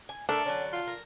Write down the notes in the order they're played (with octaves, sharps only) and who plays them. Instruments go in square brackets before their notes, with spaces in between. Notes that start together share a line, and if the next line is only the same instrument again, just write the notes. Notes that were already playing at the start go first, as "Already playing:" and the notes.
[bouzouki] G#5
[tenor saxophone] A3 [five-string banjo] D4 [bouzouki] A4 A#4 E5
[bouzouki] D3 D#3 F#3 [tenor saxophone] C#4
[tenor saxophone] F4
[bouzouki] A#4